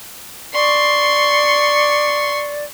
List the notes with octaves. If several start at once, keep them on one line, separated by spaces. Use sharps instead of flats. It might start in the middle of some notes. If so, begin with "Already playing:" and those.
D5 C6 C#6